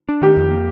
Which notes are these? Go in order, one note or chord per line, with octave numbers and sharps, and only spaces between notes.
D4
D#3 G4
F2
A#3